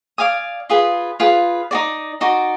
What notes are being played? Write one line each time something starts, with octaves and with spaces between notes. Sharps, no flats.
D5 F5 G#5 D#6
F4 G#4 B4
F4 G#4 B4
D#4 F#4 D5
D#4 F#4 D5